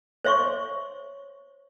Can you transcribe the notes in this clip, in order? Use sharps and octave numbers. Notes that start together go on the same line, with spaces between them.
C5 C#5 E5 C6 C#6